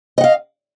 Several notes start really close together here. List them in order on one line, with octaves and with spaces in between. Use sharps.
D#5 F#5 F5